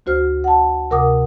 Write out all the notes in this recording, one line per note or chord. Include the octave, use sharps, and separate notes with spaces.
D2 F#4 C5 F6
F#5 A5
D2 C3 A#4 F#5 D6 D#6